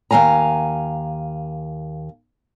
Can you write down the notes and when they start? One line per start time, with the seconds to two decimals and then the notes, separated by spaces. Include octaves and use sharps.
0.11 D#2 D#3 F5 G#5 A#5